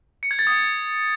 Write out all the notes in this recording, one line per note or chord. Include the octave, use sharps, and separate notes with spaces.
C#7
G#6
A6
D#6